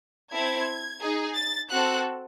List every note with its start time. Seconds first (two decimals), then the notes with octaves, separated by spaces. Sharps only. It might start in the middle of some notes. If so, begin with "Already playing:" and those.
0.32 C4 E4 A4 G#6
1.02 D#4 G#4
1.37 A6
1.72 C4 F#4 A4 F#6